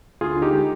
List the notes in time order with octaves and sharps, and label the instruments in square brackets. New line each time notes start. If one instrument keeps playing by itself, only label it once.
[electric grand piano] D2 F4 G#4
D3
D#4 G4
G#3